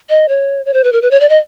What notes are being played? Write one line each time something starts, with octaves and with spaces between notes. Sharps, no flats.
D#5
C#5
C#5
C5
B4
A#4
B4
C#5
D5
D#5